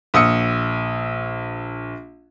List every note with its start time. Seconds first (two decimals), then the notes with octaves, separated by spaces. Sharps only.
0.14 A#1 D#6 E6 C#7